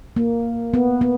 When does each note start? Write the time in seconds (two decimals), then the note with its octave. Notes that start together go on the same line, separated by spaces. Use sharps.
0.16 A#3
0.74 B3
1.01 B3